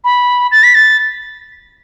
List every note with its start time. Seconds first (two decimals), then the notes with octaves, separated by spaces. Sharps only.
0.04 B5
0.52 A6
0.63 B6
0.75 A6